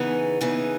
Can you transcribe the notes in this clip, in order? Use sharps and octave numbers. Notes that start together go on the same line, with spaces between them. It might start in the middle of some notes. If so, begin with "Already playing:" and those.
Already playing: C#3 E3 B3 D#4 G#4
C#3 E3 B3 D#4 G#4